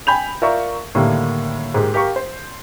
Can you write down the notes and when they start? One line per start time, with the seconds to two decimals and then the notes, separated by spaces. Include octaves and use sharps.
0.07 G5 G#5 B5 G6 F7
0.42 F4 A#4 D5 E5 F5 C#6
0.95 A2 D3 D#3 G3 A#3
1.74 G#2 G4 A#4
1.94 G4 A#4 F5 C#6
2.16 C5